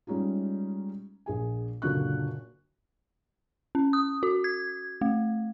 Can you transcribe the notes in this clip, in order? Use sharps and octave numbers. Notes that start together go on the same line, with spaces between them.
G3 G#3 C#4 D#4 F4
A#1 G#4 G#5
F#1 A#2 D3 F#4 C#6 F#6
C#4
D#6
F#4
G#6
A3